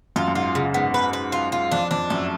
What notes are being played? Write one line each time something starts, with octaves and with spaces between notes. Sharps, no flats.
F#2 F4
F#2
G#2 F4
C#3
G#2 B3
B4
B4
F4
F4
F2 D4
F2 D4
F#2 A3